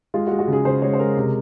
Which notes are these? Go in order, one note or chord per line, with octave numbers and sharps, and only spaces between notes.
G#3 F4
F#4
G#3
F#4
C#3
G#4
C#3 C5
G#3 C#5
C5
G#3 A#4
C3